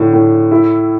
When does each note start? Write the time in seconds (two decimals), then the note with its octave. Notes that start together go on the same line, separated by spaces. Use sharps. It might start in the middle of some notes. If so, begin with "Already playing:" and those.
Already playing: A2 D3
0.13 A2
0.51 E4